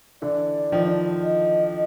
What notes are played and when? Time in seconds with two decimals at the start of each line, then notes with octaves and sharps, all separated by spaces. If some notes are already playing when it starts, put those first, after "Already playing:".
0.22 D3 E3 D5
0.72 D#3 F3
1.23 D#5